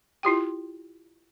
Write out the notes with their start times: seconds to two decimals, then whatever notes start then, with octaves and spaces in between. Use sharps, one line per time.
0.23 E4 F4 G4 G5